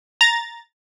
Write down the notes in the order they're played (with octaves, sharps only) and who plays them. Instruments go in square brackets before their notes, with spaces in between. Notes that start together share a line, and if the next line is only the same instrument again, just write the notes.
[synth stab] A#5 A6